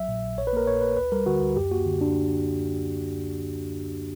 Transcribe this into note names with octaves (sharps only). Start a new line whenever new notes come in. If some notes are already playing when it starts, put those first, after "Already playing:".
Already playing: A#1 F#3 E5
A#2
A#1
A#1 C#5
B4
A#3 A#4
A#2 C#5
A#1 B4
D2 B4
G3 A#4
D3 F#4
D2
F#2 G4
A#3 F#4
D3
D4